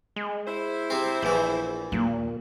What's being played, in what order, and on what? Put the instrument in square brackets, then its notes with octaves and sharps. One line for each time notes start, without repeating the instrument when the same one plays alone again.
[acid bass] G#3
[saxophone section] E4 C5
[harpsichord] C3 C4
[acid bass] A#1 [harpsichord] E2 E3
[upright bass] D#2 A#3 [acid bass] A#2